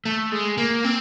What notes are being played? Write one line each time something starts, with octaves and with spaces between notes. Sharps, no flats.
A3
G#3
A#3
C4